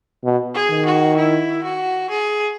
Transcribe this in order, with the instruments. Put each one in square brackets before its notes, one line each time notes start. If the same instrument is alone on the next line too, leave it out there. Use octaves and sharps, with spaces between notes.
[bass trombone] B2
[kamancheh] G#4
[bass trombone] D#3
[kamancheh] F#4
E4
F#4
G#4